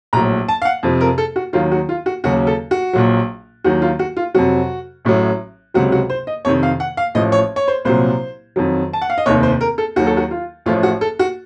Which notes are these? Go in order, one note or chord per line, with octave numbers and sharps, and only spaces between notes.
A#1 A2 F#3 A#5
A5
F5
F#5
F2 C3 F3
A#4
A4
F#4
D#2 D#3 F#3 F4
F#4
F4
F#4
D#2 C#3 F#3 F#4
A4
F#4
A#1 A#2 F#3
D#2 D#3 F#3 F#4
F4
F#4
F4
F2 C3 F#3 F#4
A1 A2 F#3
C#2 C3 F#3 F#4
F#4
C5
D#5
F2 C3 D#3 C#5
F5
F#5
F5
A1 A2 F3 D#5
C#5
C#5
C5
C2 A#2 F#3 C5
F2 D#3 F#3
A5
F#5
F5
D#5
F1 D#2 D#3 C#5
C5
A#4
A4
D#2 D#3 F#3 F#4
A4
F#4
F4
A1 A2 F3 F4
F#4
A4
F#4